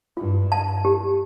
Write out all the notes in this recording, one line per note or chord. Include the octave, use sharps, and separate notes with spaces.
G2 F4
A5
G4